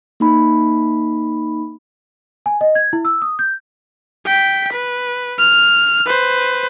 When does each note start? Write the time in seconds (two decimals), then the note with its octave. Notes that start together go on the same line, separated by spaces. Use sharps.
0.20 A#3 D#4 B5
2.46 G#5
2.61 D#5
2.75 G#6
2.93 E4
3.05 E6
3.22 D#6
3.39 G6
4.26 G5 B6
4.73 B4
5.39 F6
6.06 B4 C5